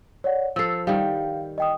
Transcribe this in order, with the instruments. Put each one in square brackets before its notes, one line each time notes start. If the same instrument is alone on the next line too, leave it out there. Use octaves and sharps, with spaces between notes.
[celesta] C#5 D5 F#5
[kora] F3 A4 [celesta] E6 C7
[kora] D#3 G3 [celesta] F5 G5
[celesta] D#5 G5 D#6